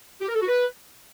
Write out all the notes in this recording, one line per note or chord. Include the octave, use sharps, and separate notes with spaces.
G4
A#4
A4
F#4
B4